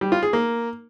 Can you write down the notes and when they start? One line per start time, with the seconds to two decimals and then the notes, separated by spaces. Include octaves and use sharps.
0.01 G3
0.12 F4
0.23 G#4
0.33 A#3